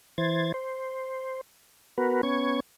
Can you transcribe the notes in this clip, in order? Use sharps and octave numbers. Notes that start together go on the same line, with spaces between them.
E3 C5 G#6 A6
C5
B3 F#4 A#4 B4
B3 C#4 C#6 G#6